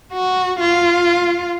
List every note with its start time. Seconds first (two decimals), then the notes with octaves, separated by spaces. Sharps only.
0.13 F#4
0.60 F4